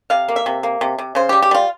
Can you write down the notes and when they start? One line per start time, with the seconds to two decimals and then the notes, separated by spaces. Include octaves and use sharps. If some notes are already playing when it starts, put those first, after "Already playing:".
0.10 C3 F5
0.28 A#3
0.36 E5
0.46 C3
0.63 A#3
0.81 C3
0.98 C3
1.15 C#3 C5
1.29 G3 G4
1.42 G4
1.51 G3 F4